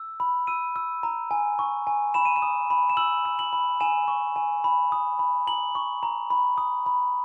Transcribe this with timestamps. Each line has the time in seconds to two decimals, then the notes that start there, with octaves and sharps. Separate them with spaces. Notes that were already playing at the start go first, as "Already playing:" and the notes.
Already playing: E6
0.20 B5
0.47 E6 D#7
0.76 E6
1.03 A#5
1.31 G#5
1.59 C#6
1.87 G#5
2.14 B5 E7
2.25 D#7
2.36 E7
2.42 D#6
2.70 B5
2.90 E7
2.97 E6 F#7
3.25 E6
3.39 F#7
3.53 B5
3.80 G#5 E7
4.08 C#6
4.36 G#5
4.64 B5
4.92 D#6
5.19 B5
5.47 A#5 F#7
5.75 C#6
6.03 A#5
6.30 B5
6.58 D#6
6.86 B5